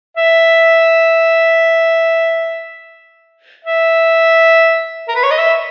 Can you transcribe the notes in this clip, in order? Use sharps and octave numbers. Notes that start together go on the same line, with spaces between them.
E5
E5
A#4
B4
C#5
D#5
E5